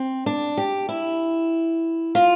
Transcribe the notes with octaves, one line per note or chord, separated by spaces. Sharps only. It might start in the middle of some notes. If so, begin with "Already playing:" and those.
Already playing: C4
D4
G4
E4
F4